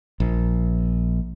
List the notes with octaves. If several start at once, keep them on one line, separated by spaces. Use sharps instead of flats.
A#1